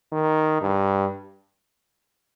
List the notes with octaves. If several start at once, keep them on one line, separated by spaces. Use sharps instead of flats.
D#3
G2